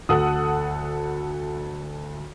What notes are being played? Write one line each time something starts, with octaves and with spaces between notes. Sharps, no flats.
D2 A4 F#5 D#6